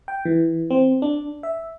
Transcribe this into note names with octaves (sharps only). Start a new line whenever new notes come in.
G5
E3
C4
D4
E5